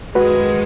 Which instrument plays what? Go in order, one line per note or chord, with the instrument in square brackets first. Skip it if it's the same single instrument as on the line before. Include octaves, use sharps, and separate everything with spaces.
[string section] F#2 D#3 G#3 [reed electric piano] F#4 B4